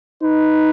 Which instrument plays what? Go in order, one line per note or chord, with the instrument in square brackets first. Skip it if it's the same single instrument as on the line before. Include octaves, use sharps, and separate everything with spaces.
[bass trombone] D#4 [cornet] B4